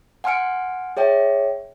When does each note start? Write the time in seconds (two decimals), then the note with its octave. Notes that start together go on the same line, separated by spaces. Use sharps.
0.24 F#5 G#5 C6 F6 C#7 D7
0.97 G#4 C#5 E5 G5